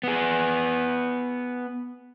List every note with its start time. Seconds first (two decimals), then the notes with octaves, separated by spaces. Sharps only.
0.03 B3 G#4